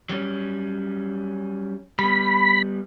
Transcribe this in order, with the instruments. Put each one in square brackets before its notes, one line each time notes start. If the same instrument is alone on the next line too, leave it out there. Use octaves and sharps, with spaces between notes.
[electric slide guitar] F#3 G3 C#4
[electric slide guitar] G3 B3 [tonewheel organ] B5